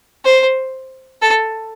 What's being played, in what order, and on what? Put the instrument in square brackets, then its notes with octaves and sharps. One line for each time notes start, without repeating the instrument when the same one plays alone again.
[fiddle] C5
A4